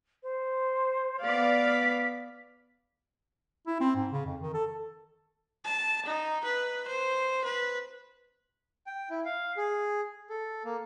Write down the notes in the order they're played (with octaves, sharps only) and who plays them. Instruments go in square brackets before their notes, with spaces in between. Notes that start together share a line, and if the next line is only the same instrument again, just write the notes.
[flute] C5
[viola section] B3 D5 F5 [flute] B6
[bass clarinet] E4
C4
G#2
C#3
F2
D#3
A4
[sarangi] A5
D#4
B4
C5
B4
[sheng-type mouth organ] G5
E4
F5
G#4
A4
A#3